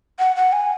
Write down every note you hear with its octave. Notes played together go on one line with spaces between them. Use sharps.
F#5
F#5
G#5